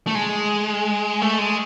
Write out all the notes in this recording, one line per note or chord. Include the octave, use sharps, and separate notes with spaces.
A3
G#3
A3
G#3